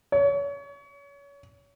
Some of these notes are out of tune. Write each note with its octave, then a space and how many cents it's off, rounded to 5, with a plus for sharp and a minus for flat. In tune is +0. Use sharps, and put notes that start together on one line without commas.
C#5 +30